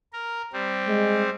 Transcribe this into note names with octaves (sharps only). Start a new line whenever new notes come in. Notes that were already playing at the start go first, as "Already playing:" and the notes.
A#4
G3 C4
G#3